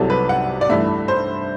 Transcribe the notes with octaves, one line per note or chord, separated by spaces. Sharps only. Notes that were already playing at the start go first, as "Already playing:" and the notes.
Already playing: C2 C3 F#3 A4
B4
F#5
D5
G2 E3 A3 E5
C5